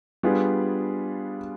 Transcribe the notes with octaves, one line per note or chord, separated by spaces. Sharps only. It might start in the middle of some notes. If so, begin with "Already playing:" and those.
G3 B3 D4 F4 G#4